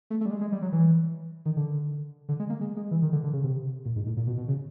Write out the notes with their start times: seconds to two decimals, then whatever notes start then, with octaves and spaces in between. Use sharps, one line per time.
0.10 A3
0.21 A3
0.26 G3
0.31 G#3
0.41 G#3
0.52 G3
0.62 F#3
0.72 E3
1.46 D#3
1.56 D3
2.29 D3
2.40 G#3
2.50 A#3
2.61 G#3
2.77 G#3
2.91 E3
3.02 D#3
3.12 D3
3.24 D3
3.33 C#3
3.44 C3
3.85 A#2
3.96 G#2
4.06 A2
4.17 A#2
4.27 B2
4.37 B2
4.48 C#3